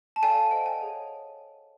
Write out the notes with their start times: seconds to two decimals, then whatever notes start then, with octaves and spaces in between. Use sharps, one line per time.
0.16 A5
0.22 A4 D5 F5 G#5
0.51 A4 C5 D#5 F#5 G5
0.66 G#5
0.80 G#4 C#5 F#5